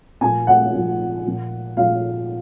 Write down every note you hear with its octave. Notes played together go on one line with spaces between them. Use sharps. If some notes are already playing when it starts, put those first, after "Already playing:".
A#2 F3 G#5
F#5
A#2 F3
A#2 F3
A#2 F3 F5